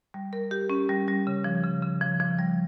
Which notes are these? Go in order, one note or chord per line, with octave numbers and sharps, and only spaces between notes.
G3
A#4
G4
C#4
G3
G3
C#3
F3
C#3
C#3
F3
F3
G3